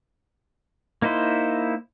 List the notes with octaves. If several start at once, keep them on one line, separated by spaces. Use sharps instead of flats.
A#3 D#4 E4 C5